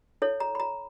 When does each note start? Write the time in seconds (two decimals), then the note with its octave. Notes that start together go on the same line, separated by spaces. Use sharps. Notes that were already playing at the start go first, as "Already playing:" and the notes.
0.22 E4 A4 C#5
0.40 A#5
0.55 B5
0.60 A#5